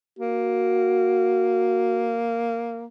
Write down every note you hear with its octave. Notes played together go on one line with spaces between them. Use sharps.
A#3 F#4